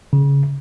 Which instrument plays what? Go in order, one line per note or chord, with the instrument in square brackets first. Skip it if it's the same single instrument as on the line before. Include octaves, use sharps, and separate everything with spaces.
[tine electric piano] C#3